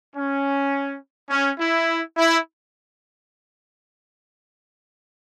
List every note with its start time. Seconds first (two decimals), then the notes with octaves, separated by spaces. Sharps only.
0.15 C#4
1.30 C#4
1.59 E4
2.17 E4